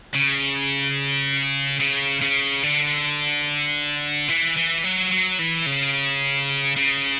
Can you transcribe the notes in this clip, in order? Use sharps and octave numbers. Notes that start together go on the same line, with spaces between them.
C#3
C#3
C#3
D3
E3
E3
F#3
F#3
E3
C#3
C#3